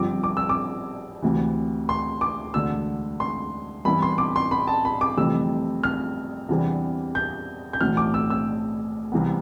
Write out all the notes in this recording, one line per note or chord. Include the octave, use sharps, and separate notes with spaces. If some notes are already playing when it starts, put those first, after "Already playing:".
Already playing: G1 G2 F3 C4 D6
D6
E6
D6
D2 C3 E3
C6
D6
E1 D2 D3 E6
C6
G2 E3 B3 E4 B5
C6
D6
C6
B5
A5
B5
D6
G1 F2 C3 E3 A3 E6
F6
E2 C3 E3 G3 D4
G6
G6
B1 A2 E3 F6
D6
E6
E6
C2 C3 E3 B3